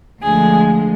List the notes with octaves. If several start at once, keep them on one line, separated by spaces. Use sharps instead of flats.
D2 D3 F3 G#3 G#4